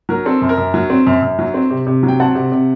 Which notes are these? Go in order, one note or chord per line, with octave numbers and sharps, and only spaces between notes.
F#3 A#4
C4 A4
F#2
A#4
F#2
F#3
C4
F#2
F#2
F#3
C4
C3
C3
F#3
G5
C4 F#5 A5
C3
C3